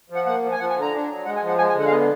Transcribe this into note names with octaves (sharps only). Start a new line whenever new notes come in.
F3
F#5
A#3 F#5
F3
G#5
F3 F#5
G#5
D3
A#5
D4
F#3
G#3 F#5
G#5
F3
F#5
G#3 G#5
G#5
D3
F#5
F5
B3 D#5